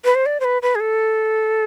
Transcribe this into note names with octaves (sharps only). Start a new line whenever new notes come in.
B4
C5
D5
C5
B4
B4
G#4
A4